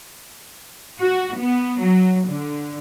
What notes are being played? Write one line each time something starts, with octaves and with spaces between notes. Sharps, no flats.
F#4
B3
F#3
D3